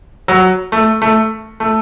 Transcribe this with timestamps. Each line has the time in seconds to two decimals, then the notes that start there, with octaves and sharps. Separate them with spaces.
0.28 F#3
0.72 A3
1.02 A3
1.60 A3